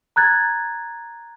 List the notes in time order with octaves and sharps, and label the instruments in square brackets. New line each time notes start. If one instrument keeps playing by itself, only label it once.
[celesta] A#5 F#6 G#6 A6